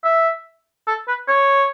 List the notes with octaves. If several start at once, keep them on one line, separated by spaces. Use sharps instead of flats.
E5
A4
B4
C#5